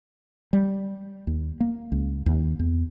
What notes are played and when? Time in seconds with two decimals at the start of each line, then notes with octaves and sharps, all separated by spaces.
0.53 G3
1.27 D#2
1.60 A#3
1.92 C#2
2.26 D#2
2.59 E2